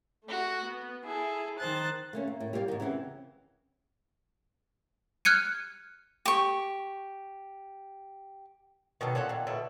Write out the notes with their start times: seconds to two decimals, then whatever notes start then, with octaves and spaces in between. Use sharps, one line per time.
0.23 A3 F#4
0.63 B3
1.04 E4 G#4 A4
1.57 D#3 C5 F#6 A6
2.13 A3 A#3 C#4
2.27 A#3
2.40 A2
2.53 G3 A#3 F#4 C#5 D5 F5
2.68 G#2 D#3
2.80 C#3 E3 B3 C4
5.25 F6 F#6 G#6 C#7 D#7
6.26 G4 C#6
9.01 B2 D#3 F#3 A4
9.15 A#2 C#4 A4 F#5
9.29 A#2 D#3
9.47 B2 D3 E4 C#5